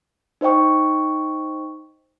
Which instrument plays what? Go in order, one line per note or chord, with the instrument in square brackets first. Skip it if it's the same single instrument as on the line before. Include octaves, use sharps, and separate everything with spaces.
[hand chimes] D#4 C5 D#5 G5 C#6